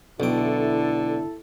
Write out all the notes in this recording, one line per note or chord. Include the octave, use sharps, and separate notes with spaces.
B1 D3 E4 A4 G5